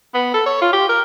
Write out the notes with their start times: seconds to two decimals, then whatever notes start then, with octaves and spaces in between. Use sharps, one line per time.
0.14 B3
0.34 A4
0.46 C#5
0.62 F4
0.73 G4
0.89 A#4